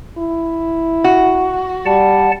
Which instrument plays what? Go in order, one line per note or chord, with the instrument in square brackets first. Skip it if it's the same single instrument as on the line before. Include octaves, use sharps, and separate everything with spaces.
[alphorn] E4
[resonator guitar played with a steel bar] F#4
[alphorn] G3 [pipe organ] D5 F#5 A5